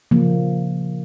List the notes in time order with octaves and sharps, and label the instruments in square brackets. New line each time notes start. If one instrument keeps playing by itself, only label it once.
[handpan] C#3 F3 A#3